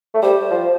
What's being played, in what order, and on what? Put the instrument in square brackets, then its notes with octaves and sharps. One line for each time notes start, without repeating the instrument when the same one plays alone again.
[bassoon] A3
[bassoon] G3 [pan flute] C5
[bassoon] F3